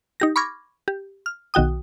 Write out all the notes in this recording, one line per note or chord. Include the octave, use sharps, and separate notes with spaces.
D#4 G4 A#6
B5 C#6 D6 F6 G#6 A#6
G4
F6
B1 D#3 F#4 G5 D#6